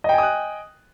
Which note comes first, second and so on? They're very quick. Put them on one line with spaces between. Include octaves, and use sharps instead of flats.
D#5 G5 G#5 D#6 F#6